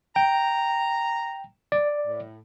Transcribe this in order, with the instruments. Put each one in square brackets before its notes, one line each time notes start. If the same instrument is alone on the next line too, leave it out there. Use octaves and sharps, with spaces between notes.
[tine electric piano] G5 [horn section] A#5
[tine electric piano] D5
[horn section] A2